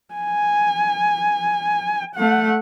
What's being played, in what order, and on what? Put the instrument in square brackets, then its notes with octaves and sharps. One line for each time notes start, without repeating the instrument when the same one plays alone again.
[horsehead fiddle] G#5
A3 F#5